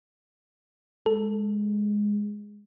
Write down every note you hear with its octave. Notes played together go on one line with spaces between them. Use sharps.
G#3 A4